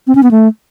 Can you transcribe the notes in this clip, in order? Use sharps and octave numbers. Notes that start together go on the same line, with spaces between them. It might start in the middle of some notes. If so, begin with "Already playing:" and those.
C4
C#4
B3
A3